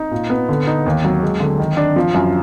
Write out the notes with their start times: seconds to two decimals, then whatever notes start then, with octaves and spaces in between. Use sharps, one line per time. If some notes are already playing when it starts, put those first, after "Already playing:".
Already playing: D#4
0.11 A#2
0.30 B3
0.49 D3
0.67 D#4
0.86 D#2
1.05 F#3
1.23 G#3
1.40 D3
1.59 D#3
1.77 D4
1.96 F3
2.14 F#2